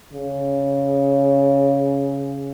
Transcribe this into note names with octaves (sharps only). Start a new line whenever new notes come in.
C#3